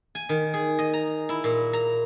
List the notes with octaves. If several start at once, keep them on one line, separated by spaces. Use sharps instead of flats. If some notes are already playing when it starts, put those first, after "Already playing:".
G#5
D#3
G#4
D#5
A#5
E4
A#2
A#5